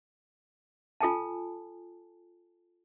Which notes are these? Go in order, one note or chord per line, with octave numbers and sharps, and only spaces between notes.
F4 A4 G#5 A5